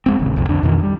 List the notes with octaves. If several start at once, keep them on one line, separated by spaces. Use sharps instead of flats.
F2 G#3 C4
D#1 A1 D#2 C#3
B1 F2 C3
F2 D3 D4
F2 B2 D#3 E3
G3